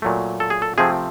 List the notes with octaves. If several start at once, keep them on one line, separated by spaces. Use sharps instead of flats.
A#2 F#3 A3
A4
G#4
A4
C3 F3 A3 C4 G#4